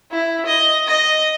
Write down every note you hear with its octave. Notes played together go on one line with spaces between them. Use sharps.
E4
D#5
D#5